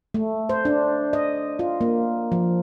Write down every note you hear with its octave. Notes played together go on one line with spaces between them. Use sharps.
A3
C5
D4
D#5
F4
A#3
F3